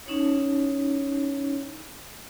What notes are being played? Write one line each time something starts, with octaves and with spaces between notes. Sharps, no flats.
C#4 D#4 E4 C#5